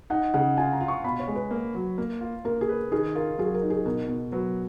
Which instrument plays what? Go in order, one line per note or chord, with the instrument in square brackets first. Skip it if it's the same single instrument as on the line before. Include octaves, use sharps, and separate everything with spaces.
[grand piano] D#4 [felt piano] F#5
[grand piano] C#3 [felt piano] F#5
[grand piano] F4 [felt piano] G#5
[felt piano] A#5
[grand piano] F4
[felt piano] C#6
[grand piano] B2 [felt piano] B5
[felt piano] C#5
[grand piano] G#3
[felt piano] B4
[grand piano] A#3
F#3
A#3
F4
[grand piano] A#3 [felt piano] A#4
[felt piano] G#4
[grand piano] B4
[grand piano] D#3 [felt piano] G#4
[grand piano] F4 [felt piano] A#4
[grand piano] F#3 [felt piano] G#4
[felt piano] A#4
[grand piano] D#4
[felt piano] G#4
[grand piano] B2 [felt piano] A#4
[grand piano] B2
[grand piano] F#3 [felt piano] B4